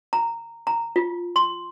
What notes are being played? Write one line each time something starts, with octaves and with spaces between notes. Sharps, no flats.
A#5
A#5
F4
C6